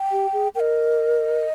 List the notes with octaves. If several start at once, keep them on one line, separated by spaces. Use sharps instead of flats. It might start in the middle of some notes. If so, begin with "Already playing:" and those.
Already playing: G5
G4
G#4
A#4 D#5 G5